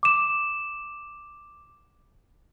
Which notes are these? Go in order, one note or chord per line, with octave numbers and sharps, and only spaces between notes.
D6 E7